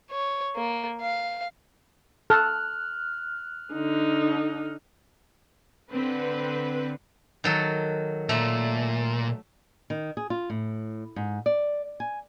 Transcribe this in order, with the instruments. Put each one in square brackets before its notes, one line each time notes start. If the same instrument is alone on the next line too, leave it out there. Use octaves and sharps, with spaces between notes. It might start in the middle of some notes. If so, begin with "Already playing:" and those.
[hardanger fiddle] C#5
A#3
F5
[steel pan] A4 [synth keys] F6 F#6
[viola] D3 D#4
[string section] D3 C4 B4
[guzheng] D#3 F#3 A4
[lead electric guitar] A#2 [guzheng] A3
[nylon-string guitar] D#3
G#4
F4
A2
G#2
D5
G#5